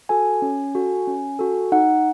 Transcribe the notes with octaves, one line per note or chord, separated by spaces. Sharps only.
F#4 A4 G#5
C#4
F#4 A4
C#4
F#4 A4
D#4 F#5